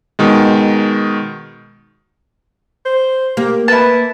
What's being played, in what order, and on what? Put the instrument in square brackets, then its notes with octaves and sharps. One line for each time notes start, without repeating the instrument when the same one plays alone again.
[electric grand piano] B2 D#3 G#3
[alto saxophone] C5
[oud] A#3 [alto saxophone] G4
[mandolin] E4 A5 [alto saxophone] B4